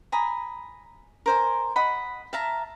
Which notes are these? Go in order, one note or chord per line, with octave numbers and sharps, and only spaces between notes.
G#5 A#5 B5 D#6
A#4 C5 G#5
D#5 F#5 B5
E5 F5 A5 A#5